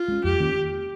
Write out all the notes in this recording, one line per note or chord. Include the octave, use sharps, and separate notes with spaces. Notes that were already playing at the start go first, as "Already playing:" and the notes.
Already playing: F4
G#3 C#4
F2 G4
D#3 A#3 C#4